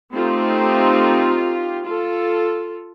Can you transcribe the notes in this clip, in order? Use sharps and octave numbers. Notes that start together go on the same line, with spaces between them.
A3 C4 D#4 F4 G4
F4 A4